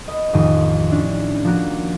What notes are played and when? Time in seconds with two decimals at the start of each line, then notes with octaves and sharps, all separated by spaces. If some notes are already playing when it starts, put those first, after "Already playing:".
0.08 B4 D#5
0.33 A1 F2 D#3 D#6 D#7
0.90 C#4 D4 E4
1.44 F3 A#3 F#4